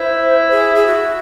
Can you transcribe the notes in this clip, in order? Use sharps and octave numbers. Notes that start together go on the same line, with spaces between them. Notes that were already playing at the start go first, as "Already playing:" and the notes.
Already playing: E4 C5
G#4
G#4
F#4